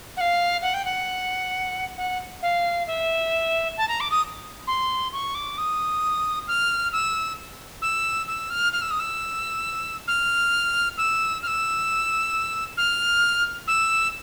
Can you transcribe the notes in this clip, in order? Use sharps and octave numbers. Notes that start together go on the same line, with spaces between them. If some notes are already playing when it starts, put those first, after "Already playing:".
F#5
F5
F#5
G5
F#5
F#5
F5
E5
A5
A#5
D6
D#6
C6
C#6
D6
D#6
F6
E6
E6
E6
F6
F6
E6
D#6
E6
F6
E6
F6
E6
F6
E6